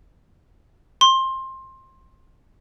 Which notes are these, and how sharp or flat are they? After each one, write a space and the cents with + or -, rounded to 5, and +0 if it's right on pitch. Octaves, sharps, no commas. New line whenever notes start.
C6 +20